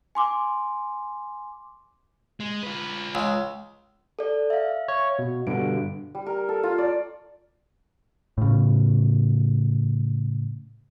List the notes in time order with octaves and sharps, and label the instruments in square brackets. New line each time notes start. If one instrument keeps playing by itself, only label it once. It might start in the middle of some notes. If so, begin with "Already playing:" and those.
[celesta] G#5 C6 D6
[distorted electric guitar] G#3
F4 B4
[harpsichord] C#2
[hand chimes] A4 D5
E5 F5
[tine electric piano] C#5
B2
[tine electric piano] G2 B2 D3 [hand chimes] D7
[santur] G3
A#4
A4
F4
D5
[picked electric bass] A2 C#3